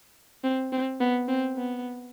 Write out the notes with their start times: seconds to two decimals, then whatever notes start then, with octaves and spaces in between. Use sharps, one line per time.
0.44 C4
0.72 C4
1.01 B3
1.28 C4
1.57 B3